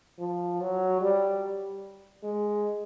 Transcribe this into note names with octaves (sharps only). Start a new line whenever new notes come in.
F3
F#3
G3
G#3